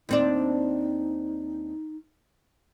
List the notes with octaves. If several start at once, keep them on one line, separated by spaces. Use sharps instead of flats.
D#2 C4 D4 D#4